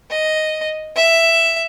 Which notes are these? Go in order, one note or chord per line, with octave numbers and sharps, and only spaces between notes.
D#5
E5